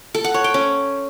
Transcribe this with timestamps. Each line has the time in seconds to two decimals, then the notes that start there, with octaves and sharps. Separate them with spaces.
0.15 A4
0.24 F#5
0.34 C#5
0.44 G5
0.54 C#4